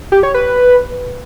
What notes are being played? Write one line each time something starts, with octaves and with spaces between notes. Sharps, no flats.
G4
C#5
B4